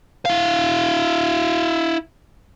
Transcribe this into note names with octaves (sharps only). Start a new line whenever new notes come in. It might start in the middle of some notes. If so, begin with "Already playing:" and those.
E4 F5